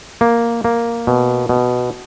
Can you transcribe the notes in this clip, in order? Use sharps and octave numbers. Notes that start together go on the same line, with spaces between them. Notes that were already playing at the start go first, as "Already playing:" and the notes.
A#3
A#3
B2
B2